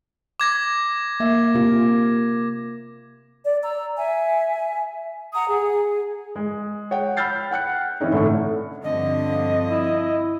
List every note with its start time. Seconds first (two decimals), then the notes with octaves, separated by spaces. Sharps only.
0.40 D6 G#6 A#6
1.20 A#3 E5
1.54 C3 A#3 F4
3.44 D5
3.64 A#5 E6
3.97 E5 G#5
5.34 F#5 A#5 D#6
5.48 G#4
6.36 G#3
6.91 C#5 F#5 G5
7.17 B5 E6 F6 G6 A6 C7
7.51 F#5 G5 F#6 C#7
8.00 E3 C4 C#4 D#4
8.12 A2 D3 A3 C#6
8.83 G2 D3 F3 C4 D#5
9.66 E4